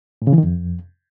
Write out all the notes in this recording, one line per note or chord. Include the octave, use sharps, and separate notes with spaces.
A2
C#3
E3
D#3
F2